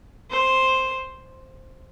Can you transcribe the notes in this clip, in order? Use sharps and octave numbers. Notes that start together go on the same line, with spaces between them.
C5